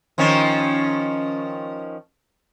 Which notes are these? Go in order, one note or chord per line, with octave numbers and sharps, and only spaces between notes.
D#3 F3 C#4